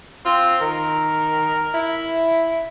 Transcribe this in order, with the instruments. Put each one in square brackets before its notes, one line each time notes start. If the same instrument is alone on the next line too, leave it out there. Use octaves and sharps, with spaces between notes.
[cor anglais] C4 [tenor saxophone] F4
[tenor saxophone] D#3 [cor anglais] A#4
[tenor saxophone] E4